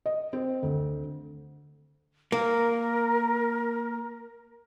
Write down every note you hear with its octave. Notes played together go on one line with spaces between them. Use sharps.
D#5
C4
D2
A#3 A#4